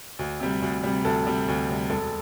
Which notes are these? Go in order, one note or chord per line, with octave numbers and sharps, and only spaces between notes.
D2
C3 G3
D2
C3 G3
D2 A4
C3 G3
D2
C3 G3
E1 A4